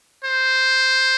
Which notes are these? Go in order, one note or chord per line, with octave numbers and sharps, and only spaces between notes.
C5